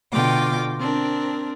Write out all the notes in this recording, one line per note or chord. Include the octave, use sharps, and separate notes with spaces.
B2 D3 F4 G5 D6
C4 D4 A#4